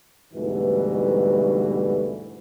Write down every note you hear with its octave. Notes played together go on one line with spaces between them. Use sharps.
D2 G#2 B2 E3 G3